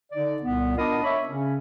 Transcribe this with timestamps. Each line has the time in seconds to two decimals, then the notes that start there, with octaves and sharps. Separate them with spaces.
0.12 D3 D#4 D5
0.42 C2 A#2 B3
0.77 B3 D4 F4 A#4 D#5
1.04 C#5 E5 B5
1.27 C#3 C#4